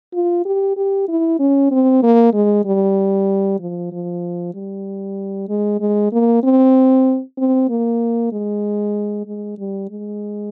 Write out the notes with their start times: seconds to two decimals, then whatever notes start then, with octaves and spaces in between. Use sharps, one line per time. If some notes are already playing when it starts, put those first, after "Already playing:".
0.14 F4
0.45 G4
0.77 G4
1.08 E4
1.40 C#4
1.71 C4
2.03 A#3
2.34 G#3
2.65 G3
3.60 F3
3.92 F3
4.55 G3
5.49 G#3
5.81 G#3
6.13 A#3
6.43 C4
7.38 C4
7.70 A#3
8.32 G#3
9.26 G#3
9.58 G3
9.90 G#3